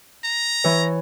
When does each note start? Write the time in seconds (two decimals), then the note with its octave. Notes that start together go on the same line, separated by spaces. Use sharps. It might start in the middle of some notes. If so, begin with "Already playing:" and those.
0.24 A#5
0.64 E3 C#5